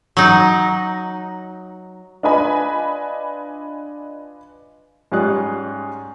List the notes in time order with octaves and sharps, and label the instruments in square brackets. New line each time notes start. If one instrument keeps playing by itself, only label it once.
[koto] F#3 D#4
[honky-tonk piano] D4 F4 B4 D#5 G#5 B5
[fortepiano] G#2 G3 C#4 F4 D#6 F#6